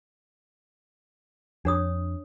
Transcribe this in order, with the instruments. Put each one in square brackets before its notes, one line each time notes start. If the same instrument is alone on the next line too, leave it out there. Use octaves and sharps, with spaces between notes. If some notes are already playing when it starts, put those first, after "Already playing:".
[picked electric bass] F2 [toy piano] D4 C#5 D#6